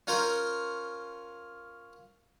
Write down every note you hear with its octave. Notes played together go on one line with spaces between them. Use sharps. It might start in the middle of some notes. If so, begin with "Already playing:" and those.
C#4 F4 A#4 C5